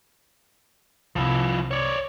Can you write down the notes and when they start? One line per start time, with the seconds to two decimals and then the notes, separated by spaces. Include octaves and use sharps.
1.16 C2 C3 F3 E4
1.71 C#5 D5